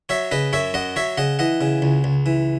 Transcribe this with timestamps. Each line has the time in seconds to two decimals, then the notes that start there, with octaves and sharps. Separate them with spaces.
0.09 F#3 C#5 E5
0.31 C#3 B4 D#5
0.53 F#2 C#5 E5
0.74 F#2 D#5 F#5
0.96 F#3 C#5 E5
1.18 C#3 D#5 F#5
1.39 E3 D#5 F#5
1.61 C#3
1.82 C#2
2.04 C#2
2.26 E3